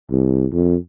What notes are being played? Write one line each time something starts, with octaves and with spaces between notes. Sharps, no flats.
C2
F2